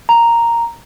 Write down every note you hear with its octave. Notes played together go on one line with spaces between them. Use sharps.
A#5